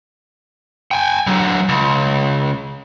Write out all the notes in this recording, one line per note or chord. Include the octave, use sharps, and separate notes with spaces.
G5 G#5
D3 F#3
C#2